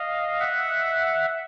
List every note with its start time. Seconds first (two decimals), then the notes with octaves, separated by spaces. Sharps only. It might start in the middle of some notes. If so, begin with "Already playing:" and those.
Already playing: D#5 F5
0.40 E5 F#5